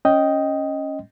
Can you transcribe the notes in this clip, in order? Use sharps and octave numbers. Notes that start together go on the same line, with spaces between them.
C#4 D#5 G5